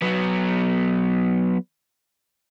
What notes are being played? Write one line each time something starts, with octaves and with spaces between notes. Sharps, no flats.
F#3 B3